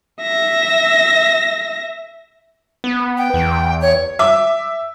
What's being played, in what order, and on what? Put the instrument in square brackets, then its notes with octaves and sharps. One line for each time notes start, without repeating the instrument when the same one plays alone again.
[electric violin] E5 A#6
[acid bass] B3
[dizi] G5
[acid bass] E2
[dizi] C#5
[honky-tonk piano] E5 D6